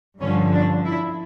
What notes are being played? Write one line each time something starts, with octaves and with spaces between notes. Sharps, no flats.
G2 D3 F3 C#4
D4
E4